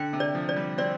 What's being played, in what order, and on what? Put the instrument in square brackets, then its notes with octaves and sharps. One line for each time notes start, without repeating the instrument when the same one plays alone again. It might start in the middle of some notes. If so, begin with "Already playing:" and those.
Already playing: [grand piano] D3 [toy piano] G5
[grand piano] C3
[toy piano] D5
[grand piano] F3
[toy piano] D5
[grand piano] G3
[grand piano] C4 [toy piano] D5